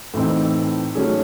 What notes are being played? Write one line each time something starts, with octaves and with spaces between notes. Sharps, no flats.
A2 E3 C4 D#4
D#3 F#3 A3 C#4 G#4